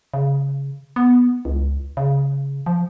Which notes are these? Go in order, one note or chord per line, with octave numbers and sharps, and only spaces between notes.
C#3
B3
C#2
C#3
F3